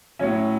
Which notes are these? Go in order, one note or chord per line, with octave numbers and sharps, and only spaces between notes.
A2 F#3 C#4